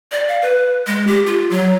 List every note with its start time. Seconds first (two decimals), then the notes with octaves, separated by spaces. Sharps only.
0.12 D5
0.28 F5
0.42 B4
0.87 G#3
1.07 G4
1.26 F4
1.50 F#3